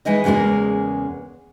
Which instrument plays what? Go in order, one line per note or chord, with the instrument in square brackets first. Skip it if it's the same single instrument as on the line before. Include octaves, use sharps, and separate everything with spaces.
[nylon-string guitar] E3 G#3 D#4 D#5
E2 C#3 G#3 A#3 A#4